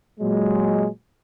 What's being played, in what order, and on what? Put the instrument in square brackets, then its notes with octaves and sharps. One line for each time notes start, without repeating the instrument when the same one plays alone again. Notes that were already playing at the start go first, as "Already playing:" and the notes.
[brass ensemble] A#2 F#3 G#3